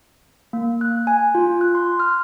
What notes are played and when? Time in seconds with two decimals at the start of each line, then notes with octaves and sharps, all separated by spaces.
0.53 A#3
0.81 F#6
1.07 G#5
1.35 F4
1.61 F#6
1.75 C6
2.00 F6